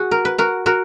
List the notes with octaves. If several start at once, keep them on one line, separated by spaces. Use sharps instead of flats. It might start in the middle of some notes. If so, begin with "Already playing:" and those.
Already playing: F#4 G#4
A#4
B4
F#4 A#4
F#4 A#4